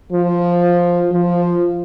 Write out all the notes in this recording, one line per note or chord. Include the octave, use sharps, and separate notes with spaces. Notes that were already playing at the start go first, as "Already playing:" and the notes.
F3
F3